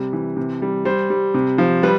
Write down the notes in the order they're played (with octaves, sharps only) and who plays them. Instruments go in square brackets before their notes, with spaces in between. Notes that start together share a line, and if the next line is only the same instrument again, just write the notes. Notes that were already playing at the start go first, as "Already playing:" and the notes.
Already playing: [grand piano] C3 G3
E3
C3
G3
G3 C5
G3
C3
F3
G3 B4